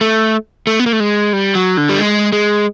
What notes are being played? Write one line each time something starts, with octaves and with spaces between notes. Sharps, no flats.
A3
A3
B3
A#3
A3
G#3
G3
F#3
D3
G3
G#3
G#3